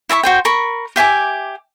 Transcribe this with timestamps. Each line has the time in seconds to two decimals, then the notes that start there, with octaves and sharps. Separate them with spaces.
0.09 E4 E5 A5 C#6
0.23 F#4 C5 G5
0.45 A#4 B5 C#6
0.96 G4 E5 G#5 D6